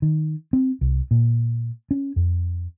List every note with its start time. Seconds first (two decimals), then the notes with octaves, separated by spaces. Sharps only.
0.02 D#3
0.53 C4
0.81 C2
1.11 A#2
1.91 C#4
2.16 F2